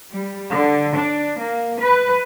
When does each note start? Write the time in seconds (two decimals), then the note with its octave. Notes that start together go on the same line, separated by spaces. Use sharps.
0.11 G3
0.50 D3
0.95 D4
1.37 A#3
1.79 B4